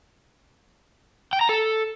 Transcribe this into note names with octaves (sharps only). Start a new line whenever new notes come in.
G5
A#5
A4